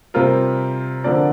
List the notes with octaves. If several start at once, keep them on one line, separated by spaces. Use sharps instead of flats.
C3 G3 C4 F4 A#4
D3 F3 C4 A#4 D5